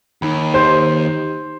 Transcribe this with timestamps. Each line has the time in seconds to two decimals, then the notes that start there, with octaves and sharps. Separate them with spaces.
0.22 D#2 D#4 B5
0.54 D#4 G4 C5